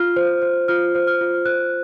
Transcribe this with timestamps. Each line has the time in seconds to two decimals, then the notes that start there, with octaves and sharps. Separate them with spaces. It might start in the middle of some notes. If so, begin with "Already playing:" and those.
Already playing: F4 F6
0.16 C5
0.42 C5
0.68 F4 F6
0.95 C5
1.07 F6
1.21 F4
1.45 C5 F#6